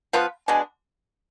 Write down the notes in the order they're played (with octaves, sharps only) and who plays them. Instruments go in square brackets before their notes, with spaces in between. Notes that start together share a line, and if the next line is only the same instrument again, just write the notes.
[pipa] F3 B3 F4 B4
[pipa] B2 G#3 D4 [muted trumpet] G#5